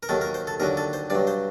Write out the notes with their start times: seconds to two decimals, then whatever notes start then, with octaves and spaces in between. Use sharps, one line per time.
0.03 A#4
0.09 D#2 D#3 F#3 A4
0.21 A#4
0.34 C5
0.47 A4
0.60 D#2 D3 F#3 A#4
0.77 A4
0.93 C5
1.10 G2 F#3 D5
1.27 C5